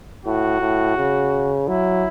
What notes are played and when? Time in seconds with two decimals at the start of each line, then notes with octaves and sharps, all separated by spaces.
0.25 A2 F#4
0.61 A2
0.97 C#3
1.68 F#3 E4